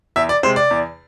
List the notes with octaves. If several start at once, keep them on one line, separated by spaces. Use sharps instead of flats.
E2 E5
D5
C3 G#3 C5
D5
E2